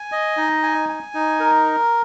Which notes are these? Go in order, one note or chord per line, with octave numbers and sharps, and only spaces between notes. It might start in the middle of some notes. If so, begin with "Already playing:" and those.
Already playing: G#5
D#5
D#4
G#5
G#5
D#4
A#4